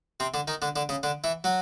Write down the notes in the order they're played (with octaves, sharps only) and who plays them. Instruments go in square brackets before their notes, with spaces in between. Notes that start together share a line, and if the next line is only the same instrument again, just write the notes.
[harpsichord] C3 C4
D3 D4
D#3 D#4
D3 D4
D3 D4
C#3 C#4
D3 D4
E3 E4
F#3 F#4